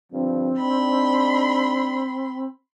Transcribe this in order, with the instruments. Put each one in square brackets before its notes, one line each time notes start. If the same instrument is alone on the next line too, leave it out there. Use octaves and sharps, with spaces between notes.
[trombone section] G2 D3 F3 [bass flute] C4
[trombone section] G#2 D4 D#4 [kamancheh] B5 C6